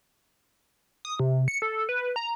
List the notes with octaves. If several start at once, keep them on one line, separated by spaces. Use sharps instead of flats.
D#6
C3
C#7
A4
B4
A#5